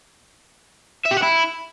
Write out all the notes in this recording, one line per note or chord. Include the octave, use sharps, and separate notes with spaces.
E5
G4
F#5
E4